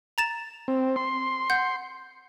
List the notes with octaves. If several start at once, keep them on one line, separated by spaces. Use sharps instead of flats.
A#5 A6 E7
C4
C6
F#5 G6